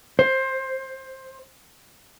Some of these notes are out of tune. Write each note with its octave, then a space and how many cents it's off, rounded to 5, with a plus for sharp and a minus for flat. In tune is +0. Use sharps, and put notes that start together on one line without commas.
C5 +15